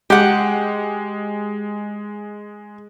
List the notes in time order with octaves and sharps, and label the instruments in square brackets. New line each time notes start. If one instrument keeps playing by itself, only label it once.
[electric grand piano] G#3 [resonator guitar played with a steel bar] G4 F#5